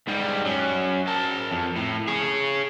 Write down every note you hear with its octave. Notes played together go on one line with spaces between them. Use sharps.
G#2 G3
F#3 C#4
A#4 A5
F2
A2
G#4 C#5